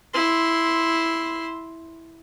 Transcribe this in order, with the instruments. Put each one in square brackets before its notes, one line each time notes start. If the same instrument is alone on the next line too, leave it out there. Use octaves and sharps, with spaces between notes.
[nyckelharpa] E4 C6